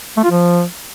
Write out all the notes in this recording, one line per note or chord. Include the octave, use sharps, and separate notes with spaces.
A3
F4
F3